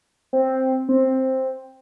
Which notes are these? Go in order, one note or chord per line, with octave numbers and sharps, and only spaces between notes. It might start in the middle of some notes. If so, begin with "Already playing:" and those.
C4
C4